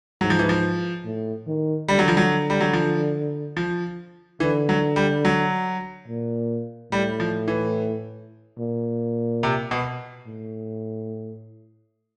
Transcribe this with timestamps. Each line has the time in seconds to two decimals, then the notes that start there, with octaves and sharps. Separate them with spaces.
0.21 G#2 F#3
0.30 F3
0.39 E3
0.49 F3
1.05 A2
1.47 D#3
1.88 D3 G3
1.99 F#3
2.08 F3
2.17 F#3
2.50 G3
2.61 F#3
2.73 F3
3.57 F3
4.40 D3 E3
4.69 F#3
4.96 G3
5.25 F#3
6.08 A#2
6.92 A2 G3
7.20 F3
7.48 E3
8.59 A#2
9.43 C3
9.71 B2
10.27 A2